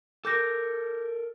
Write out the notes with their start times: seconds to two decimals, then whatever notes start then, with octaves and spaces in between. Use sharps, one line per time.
0.25 A4 A#4 D6 G6 A#6